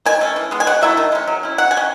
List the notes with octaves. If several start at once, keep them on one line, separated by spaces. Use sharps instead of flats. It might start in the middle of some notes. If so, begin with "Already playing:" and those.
D#3 G#5
A3 C#4
E3
G#3 B3
G#5
B2 F#5
F#3 A3 E4 E5
D#3
G#3 C#4
F#3
C#4 E4
F#3 F#5
E4 G#5
C#4